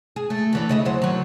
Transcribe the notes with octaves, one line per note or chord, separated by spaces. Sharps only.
G#4
A3
D2 E3 D4
C#3 D#5 E5
D#2 F#3 C5
D#3 F#3